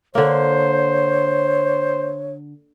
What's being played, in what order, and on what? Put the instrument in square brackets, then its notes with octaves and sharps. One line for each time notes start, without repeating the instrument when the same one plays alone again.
[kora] D3 A#3 [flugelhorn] C5 [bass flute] C#5